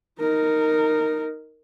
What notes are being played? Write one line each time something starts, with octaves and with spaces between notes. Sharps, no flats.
D#4 A#4